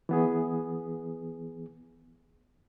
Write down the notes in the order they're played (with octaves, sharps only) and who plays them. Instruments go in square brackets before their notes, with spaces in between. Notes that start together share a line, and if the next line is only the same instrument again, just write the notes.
[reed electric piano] E3 B3 G#4